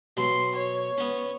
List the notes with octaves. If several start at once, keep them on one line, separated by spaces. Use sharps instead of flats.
B2 F#3 C6
C#5
B3 C#4